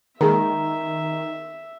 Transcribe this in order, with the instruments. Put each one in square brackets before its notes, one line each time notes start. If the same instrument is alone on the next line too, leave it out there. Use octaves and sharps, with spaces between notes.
[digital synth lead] D#3 [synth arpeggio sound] G#3 A#3 [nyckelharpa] E5 [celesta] A#5